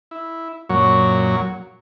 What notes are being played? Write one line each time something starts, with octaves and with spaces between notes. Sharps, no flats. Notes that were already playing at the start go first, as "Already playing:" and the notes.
E4
F#2 A#2 F#3 C#5